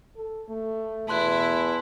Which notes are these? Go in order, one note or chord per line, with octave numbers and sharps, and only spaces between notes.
A4
A3
E2 B2 E4 A5 C6 F#6